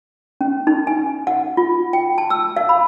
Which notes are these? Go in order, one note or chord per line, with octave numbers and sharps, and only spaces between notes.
C#4
D#4
G#5
F#5
F4
G5
A5
E6
F5
B5